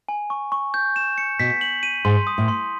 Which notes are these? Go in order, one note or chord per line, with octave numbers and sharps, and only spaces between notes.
G#5
C#6
C#6
G6
E7
C#7
B2 B6
F#7
D#7
G#2 C6
D#6
A2
C6